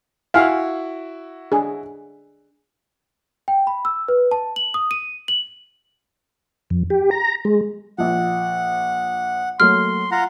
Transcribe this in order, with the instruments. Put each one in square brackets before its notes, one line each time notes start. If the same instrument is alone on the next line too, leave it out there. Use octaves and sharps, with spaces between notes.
[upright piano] E4 F#4 [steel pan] F5 G#5
[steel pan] D4 G#4
[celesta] G5
B5
E6
B4
A5
F#7
D#6
D#7
F#7
[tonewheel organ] F2
G4
A#5
G#3
[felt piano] A#1 F3 [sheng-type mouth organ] F#5
[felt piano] F#3 A3 A#3 [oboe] C6 [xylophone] F6
[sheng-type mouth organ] F4 F#5 [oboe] A#5